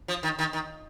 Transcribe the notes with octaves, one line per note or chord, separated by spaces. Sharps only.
F3
D#3
D#3
D#3